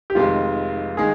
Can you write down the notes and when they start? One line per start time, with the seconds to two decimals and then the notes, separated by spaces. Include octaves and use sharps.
0.10 G4
0.15 F1 F2 D#3 G#3 F4
0.97 D#3 G#3 G#4